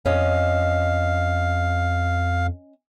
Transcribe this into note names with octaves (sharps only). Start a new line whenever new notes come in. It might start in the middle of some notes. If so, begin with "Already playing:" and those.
F2 C#4 D#5 F5